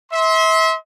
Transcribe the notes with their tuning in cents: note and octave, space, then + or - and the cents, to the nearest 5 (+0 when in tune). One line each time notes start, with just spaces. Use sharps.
E5 -35 C6 +0